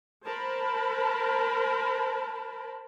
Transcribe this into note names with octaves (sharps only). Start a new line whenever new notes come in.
A#4 C5 A5 B5